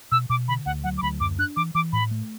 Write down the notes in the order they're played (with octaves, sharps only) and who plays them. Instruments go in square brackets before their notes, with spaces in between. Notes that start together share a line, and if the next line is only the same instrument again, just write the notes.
[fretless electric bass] B2 [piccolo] E6
[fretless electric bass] B2 [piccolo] D6
[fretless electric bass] D3 [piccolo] B5
[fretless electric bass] D2 [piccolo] F#5
[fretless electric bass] F#3 [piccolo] F#5
[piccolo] D6
[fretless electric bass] D2 [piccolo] B5
[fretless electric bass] F#2 [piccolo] D6
[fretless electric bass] D4 [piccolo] F#6
[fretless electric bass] E3 [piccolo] D6
[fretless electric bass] E3 [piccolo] D6
[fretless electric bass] A2 [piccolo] B5
[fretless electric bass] A3